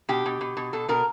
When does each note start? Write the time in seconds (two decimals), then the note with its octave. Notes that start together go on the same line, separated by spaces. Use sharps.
0.09 B2 G4
0.26 B2
0.41 B2
0.57 B2
0.73 B2 A4
0.89 B2 A#4